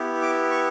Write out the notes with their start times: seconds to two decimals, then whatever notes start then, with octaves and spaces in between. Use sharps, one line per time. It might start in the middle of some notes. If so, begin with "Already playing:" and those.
Already playing: B3 E4 G4
0.22 D6
0.51 C#6